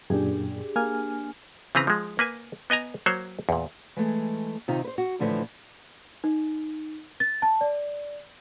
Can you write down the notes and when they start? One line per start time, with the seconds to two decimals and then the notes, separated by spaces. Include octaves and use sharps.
0.10 F#2 A#2 D4 G4 G#4
0.76 A#3 G#5 F6
1.75 C#3 E3 C4 B4 A#5
1.87 F3 G#3
2.19 A#3 B4 G#5
2.70 B3 D#5 G#5 A#5
3.06 F#3 A#3 C5 C#5 F#5
3.49 E2 A#2
3.97 E3 G#3 A3
4.68 C3 D#3 D#4 F4
4.84 B4 C5
4.98 F#4
5.19 A2 D3 E3 F3 A3
6.24 D#4
7.20 A6
7.42 A5
7.61 D5